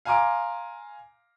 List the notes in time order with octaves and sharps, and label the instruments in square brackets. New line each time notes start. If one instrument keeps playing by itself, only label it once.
[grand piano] F5 G#5 A#5 C6 D6 D7